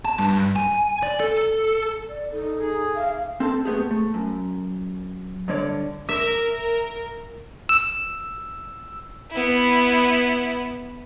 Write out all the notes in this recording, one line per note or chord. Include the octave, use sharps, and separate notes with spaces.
A5
G2
G#5
D5
A4
D5
D#4 A4
G#4
E5 F5
C4 A4 A5
A3 B3 G4 G#4
A3
F#2
G2 D3 C#5 D5
A#4 E5
E6
B3 E4